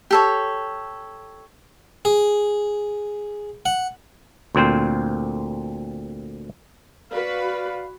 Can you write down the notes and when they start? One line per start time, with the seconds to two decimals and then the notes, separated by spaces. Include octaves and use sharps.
0.11 G4 A4 C#5
2.05 G#4
3.66 F#5
4.55 D2 A#2 C4 C5
7.12 F#4 B4 D5 F5 B5